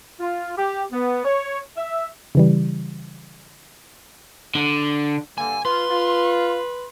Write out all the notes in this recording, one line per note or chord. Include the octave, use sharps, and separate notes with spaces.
F4
G4
B3
C#5
E5
C#3 E3 G3
D3
G2 D3 A#3 G#5
F4 B4 C6
F4